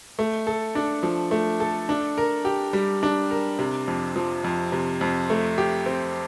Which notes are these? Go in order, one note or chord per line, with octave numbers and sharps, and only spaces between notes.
A3
A4
D4
F3
A3
A4
D4
A#4
G4
G3
D4
A#4
C3
F2
F3
F2
C3
F2
A3
G4
C4